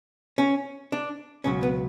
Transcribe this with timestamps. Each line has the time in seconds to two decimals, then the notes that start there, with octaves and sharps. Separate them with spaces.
0.38 C#4
0.92 D4
1.44 C#2 B2 F#3 C#4
1.63 B3